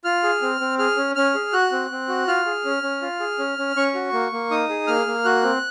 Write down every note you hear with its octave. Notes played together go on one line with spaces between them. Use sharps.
F4 F6
G#4
C4
C4
G#4 F6
C#4
C#4 F6
G#4
F#4 F#6
C4
C4
F#4
F4 F6
G#4
C#4
C#4
F4
G#4
C#4
C#4
C#4 C#6
F#4
A#3
A#3
D#4 D#6
G#4
A#3 F6
A#3
F#4 F#6
C4